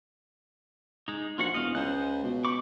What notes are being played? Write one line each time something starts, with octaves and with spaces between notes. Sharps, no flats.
G#3 D#4
A#1 F4 F#4 F#5
E1 D#5 F5
C#2 C5 F#6
B2
B5 C#6 D6